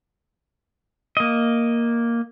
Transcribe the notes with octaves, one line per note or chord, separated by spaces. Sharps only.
A#3 D#5